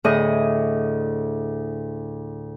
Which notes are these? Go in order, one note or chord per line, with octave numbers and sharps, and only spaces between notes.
D2 A2 G#4 D#5 D#6